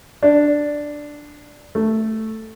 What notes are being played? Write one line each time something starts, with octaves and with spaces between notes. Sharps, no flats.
D4
A3